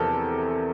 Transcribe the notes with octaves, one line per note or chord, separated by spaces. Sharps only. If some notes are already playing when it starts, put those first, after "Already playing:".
Already playing: E2 C3 F3 A4 A#4